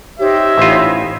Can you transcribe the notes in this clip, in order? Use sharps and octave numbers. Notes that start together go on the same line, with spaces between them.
D#4 G4 C5 C#5 E5
A1 E4 F4